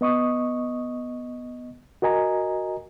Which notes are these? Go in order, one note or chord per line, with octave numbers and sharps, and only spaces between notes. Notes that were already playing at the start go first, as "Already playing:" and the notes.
B3 D#5 C#6 D#6
F#4 A#4 D#5 G#5 A#5